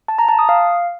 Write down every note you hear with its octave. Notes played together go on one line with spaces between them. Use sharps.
A5
A#5
A5
D#6
F5